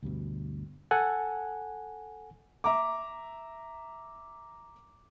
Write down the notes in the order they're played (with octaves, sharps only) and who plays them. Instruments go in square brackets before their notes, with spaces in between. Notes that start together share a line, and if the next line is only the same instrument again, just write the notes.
[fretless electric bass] D2 G2 B2
[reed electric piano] A4 F#5 G#5
[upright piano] E5 A#5 D6